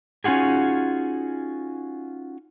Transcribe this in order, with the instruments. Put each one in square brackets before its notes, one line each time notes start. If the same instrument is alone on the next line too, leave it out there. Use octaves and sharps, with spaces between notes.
[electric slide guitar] C#4 D#4 F4 F#4 G#4